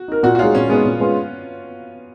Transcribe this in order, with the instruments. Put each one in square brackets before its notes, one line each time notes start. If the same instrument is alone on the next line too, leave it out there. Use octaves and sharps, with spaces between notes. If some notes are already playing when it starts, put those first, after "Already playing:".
Already playing: [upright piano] F#4
[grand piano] D#4 A#4
[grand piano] A#2 [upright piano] F#4
[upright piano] F#4
[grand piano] G#3 D#4 G#4 C#5 [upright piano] F4
[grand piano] A#2 [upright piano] C#4
[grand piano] G#3 D#4 G#4 C#5 [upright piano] B3
[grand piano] A#2
G#3 C#4 F4 B4